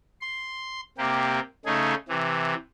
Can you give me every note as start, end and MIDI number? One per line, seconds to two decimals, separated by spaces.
0.21 0.80 84
0.98 1.40 48
0.98 1.40 58
0.98 1.40 67
1.66 1.94 49
1.66 1.94 57
1.66 1.94 63
1.66 1.94 68
2.09 2.54 48
2.09 2.54 52